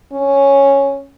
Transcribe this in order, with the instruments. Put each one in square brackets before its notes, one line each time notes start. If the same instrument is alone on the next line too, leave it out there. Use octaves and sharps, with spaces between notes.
[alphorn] C#4